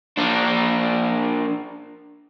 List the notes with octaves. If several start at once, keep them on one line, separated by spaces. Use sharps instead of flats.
A#3 D4